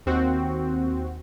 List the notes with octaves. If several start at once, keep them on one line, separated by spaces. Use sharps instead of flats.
D#2 C4 F#4